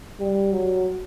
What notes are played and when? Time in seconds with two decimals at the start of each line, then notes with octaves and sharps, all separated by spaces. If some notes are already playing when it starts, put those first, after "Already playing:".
0.20 G3
0.52 F#3